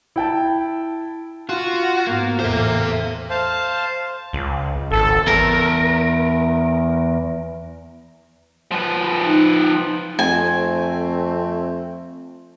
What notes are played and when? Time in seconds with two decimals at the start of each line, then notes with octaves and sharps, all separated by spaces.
0.16 E4 G5 A5
1.49 F4 F#4
2.07 G#2 A#3 B3
2.40 A1 E2 A4 C5 E5
2.70 A4
3.30 C5 F5 A5
4.33 C#2
4.92 G#1 A4
5.27 E2 A#4
8.72 F3 B4
9.25 D#4
10.19 F2 A3 C4 G#5